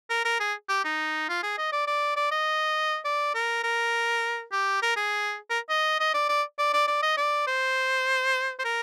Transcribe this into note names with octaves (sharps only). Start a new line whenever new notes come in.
A#4
A#4
G#4
G4
D#4
F4
G#4
D#5
D5
D5
D5
D#5
D5
A#4
A#4
G4
A#4
G#4
A#4
D#5
D#5
D5
D5
D5
D5
D5
D#5
D5
C5
C5
A#4